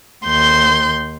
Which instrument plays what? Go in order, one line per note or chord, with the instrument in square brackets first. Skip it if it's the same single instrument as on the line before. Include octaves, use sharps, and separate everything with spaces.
[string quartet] D#2 C6 G6